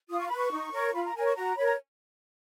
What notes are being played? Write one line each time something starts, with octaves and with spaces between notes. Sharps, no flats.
F4 D#6
C#6
B4 B5
C#6
D#4
A#4 C#5
F4 B5
A#5
A#4 C#5 G#5
C#6
F#4 A#5
A#4 C#5 B5
A#5